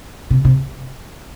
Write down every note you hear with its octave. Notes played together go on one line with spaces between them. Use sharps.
C3
C3